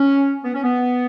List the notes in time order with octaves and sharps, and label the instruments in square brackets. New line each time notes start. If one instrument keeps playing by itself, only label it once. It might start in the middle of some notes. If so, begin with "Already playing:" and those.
Already playing: [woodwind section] C#4
B3
C#4
B3